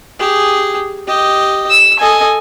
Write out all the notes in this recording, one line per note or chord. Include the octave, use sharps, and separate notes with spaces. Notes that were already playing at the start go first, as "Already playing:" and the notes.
G4 G#4
G4 D#5
E6
A4 D#5 G#5